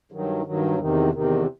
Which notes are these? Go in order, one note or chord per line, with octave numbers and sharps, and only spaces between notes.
G2 D#3 F#3
G2 D#3 F#3
E2 C3 D#3
E2 C3 D#3